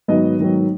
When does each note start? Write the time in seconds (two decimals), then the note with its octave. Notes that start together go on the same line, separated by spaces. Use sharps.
0.08 G#2 D#3 F#3 B3 D#5
0.40 G#2 D#3 F#3 B3